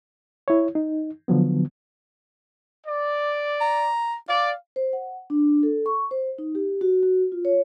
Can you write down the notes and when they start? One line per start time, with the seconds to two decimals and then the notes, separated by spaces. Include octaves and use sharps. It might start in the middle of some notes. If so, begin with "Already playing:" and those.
0.48 E4 C#5
0.75 D#4
1.28 D3 F3 F#3 B3
2.86 D5
3.61 A#5
4.29 D5 F5
4.76 C5
4.93 F#5
5.30 D4
5.63 A4
5.86 C#6
6.11 C5
6.38 D#4
6.55 G4
6.81 F#4
7.03 F#4
7.32 F4
7.45 C#5